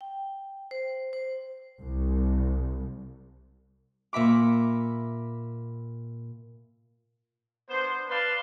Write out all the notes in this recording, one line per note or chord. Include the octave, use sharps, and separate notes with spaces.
G5
C5
C5
C2
A#2 E5 B5 D6
B3 D4 C5
B4 D5 F5 A5 C6